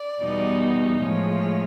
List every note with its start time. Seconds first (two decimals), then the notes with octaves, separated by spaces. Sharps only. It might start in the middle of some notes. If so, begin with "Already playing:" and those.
Already playing: D5
0.20 E2 B2 G3 B3 D#4
1.01 A2 F3 G#3 C#5